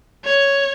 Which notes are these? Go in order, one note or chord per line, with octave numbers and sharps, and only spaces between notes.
C#5